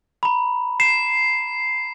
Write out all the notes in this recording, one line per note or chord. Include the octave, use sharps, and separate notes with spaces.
A#5 B5
C7 E7